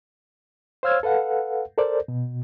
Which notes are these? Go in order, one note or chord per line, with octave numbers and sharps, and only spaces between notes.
C5 C#5 F5 E6 F6 G#6
A4 B4 F5 F#5
A4 A#4 C5 D5
B2